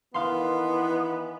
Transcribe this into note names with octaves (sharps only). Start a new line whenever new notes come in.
D#3 E3 B3 F5 C6